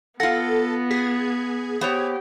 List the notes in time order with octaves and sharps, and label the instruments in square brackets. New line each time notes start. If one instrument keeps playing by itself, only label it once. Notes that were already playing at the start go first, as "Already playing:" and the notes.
[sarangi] B3 [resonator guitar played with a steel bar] F4 F#5 [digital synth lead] A4 [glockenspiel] A#6
[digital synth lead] G#4 [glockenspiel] B6
[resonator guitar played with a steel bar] B3 C5 C#5 [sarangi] G4